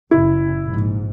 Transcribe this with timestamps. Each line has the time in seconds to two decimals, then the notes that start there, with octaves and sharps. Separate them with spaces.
0.11 F#1 E4
0.65 A#1 G#2